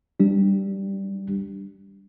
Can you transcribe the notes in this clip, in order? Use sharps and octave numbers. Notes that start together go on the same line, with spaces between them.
G3 D4 G4